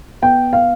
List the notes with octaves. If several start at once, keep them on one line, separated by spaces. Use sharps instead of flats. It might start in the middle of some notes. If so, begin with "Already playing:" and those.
B3 G5
F5